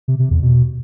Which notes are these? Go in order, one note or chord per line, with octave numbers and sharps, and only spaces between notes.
C3
C3
E2
B2